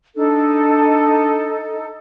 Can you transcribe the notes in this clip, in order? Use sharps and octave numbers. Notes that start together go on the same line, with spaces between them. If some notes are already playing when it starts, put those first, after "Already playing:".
D4 D#4 A4